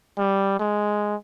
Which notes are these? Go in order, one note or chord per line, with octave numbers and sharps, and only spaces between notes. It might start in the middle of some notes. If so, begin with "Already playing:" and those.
G3
G#3